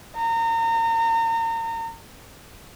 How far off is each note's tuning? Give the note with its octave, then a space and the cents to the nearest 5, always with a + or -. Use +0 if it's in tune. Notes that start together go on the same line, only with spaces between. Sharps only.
A#5 -35